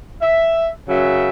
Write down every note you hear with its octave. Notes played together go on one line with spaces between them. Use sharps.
E5
F#2 C#3 F#3 E5